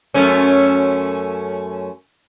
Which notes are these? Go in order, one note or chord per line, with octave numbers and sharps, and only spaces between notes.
F#2 A3 C#4